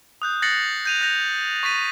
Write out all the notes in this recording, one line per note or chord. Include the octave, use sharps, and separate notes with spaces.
D#6 F#6 G6
F#6 A6 A#6 C7 C#7 F#7
G6 D#7 F7
F#6 G6 A#6 F7
C#6 A6 B6 D#7